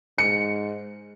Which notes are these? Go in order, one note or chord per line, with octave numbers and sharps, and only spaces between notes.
G#2 C#7